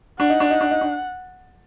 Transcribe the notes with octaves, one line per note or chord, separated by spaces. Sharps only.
D4 F#5
D#4
D4
D#4
D4
D#4
D4